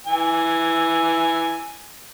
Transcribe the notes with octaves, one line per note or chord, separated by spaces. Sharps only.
E3 G#5